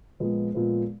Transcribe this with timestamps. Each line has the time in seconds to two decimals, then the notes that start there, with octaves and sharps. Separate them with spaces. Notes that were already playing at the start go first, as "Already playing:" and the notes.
0.20 A#2 F3 G#3 B3
0.54 A#2 F3 G#3 B3